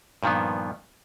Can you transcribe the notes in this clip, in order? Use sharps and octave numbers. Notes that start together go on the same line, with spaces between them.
G2 A#2 D#3 F3 B3